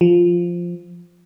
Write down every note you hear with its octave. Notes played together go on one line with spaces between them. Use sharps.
F3